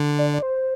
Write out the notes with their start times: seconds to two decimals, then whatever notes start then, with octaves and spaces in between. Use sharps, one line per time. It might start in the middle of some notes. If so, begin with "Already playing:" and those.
Already playing: D3
0.18 D5
0.33 D5
0.43 C5